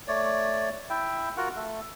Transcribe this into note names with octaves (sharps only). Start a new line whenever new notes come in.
A3 C#5 D5
E4 E5 G5
F4 F#4 A#4 F#5
A3 A4